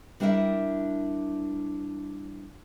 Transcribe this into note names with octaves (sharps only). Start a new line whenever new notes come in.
G3 D4 E4 A#4 E5